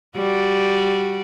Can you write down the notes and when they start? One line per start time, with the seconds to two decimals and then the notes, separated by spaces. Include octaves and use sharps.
0.16 G3 F#4 D5